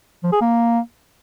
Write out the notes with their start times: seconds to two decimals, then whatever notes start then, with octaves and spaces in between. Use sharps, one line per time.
0.23 F3
0.32 G#4
0.41 A#3